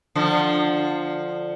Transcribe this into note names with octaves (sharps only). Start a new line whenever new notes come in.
D3 F3